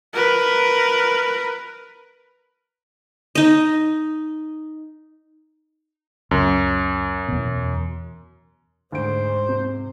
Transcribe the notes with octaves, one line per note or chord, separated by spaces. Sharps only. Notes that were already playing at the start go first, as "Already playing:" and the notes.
A#4 B4
D#4 D#5
C#2 F#2
E2 B2
D2 G#2 C5 D7
C3